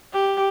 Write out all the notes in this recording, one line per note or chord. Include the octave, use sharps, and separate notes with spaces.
G4